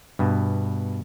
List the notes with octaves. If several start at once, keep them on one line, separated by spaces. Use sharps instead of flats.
G2 B2